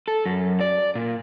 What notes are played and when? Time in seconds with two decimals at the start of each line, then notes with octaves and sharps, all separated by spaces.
0.08 A4
0.26 F#2
0.61 D5
0.95 A#2